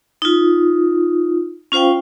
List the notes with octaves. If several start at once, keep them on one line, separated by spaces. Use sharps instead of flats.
D#4 F4
C#4 F4 C5 F5 G5